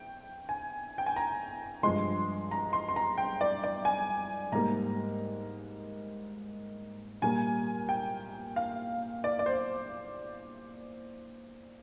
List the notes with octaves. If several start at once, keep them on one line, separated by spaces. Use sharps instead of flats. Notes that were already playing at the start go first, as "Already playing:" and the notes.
Already playing: G5
G#5
G5
G#5
A#5
G2 F3 G#3 C6
A#5
C6
C6
A#5
G5
D5
D5
G#5
G#2 G3 A#3 A#5
A#2 G3 A#3 G#5
G5
F5
D5
D5
C5